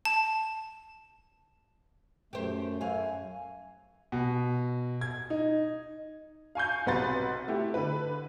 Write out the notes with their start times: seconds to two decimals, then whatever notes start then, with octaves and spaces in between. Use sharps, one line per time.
0.05 A5
2.33 F#2 A3 G4 C5
2.81 F#2 F5 G#5
4.12 B2
5.01 G#6
5.30 D#4
6.55 F5 G#5 C#6 G6
6.86 B1 C3 B4 F#5 C6 A6
7.48 A3 E4 G4
7.74 D3 B4